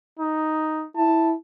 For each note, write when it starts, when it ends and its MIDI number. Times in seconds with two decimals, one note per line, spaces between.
0.19 0.86 63
0.96 1.33 64
0.96 1.31 81